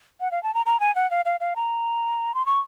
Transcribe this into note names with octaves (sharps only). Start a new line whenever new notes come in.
F#5
F5
A5
A#5
A#5
G#5
F#5
F5
F5
F5
A#5
C6
C#6